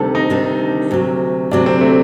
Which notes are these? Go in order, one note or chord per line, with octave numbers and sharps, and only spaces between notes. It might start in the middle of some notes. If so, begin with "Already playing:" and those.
Already playing: D2 C3 D#3 G3 D4 A4
D#4
D2 C3 D#3 G3 D4
D2 C3 F#3
D2 C3 F#3 D4
C4
A3